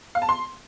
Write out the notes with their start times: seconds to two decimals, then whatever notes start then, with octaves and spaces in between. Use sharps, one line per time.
0.15 F5
0.22 A5
0.29 C6